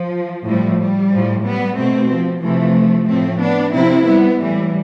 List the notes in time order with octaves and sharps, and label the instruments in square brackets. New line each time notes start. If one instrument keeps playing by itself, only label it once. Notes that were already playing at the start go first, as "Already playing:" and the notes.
Already playing: [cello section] F3
A2 F3 G3
G3
A2 F3
G3 B3
B2 A3 C4
F3
C3 E3 F3 A3
A2 F3 A3 C4
B3 D4
C3 F3 C4 E4
G3 B3
A2 E3 G3